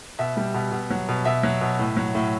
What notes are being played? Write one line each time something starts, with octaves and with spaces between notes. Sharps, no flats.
B2 E5
G3
B2
B2
F#3
B2
B2 E5
F#3
B2
A2
F#3
A2